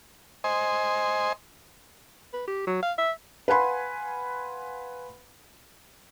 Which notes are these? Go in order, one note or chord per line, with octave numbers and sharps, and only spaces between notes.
C5 D#5 G#5
B4
G4
F#3
F5
E5
B4 F5 F#5 G#5 B5 C6